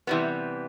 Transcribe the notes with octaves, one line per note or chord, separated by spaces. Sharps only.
C3 E3 G3 B3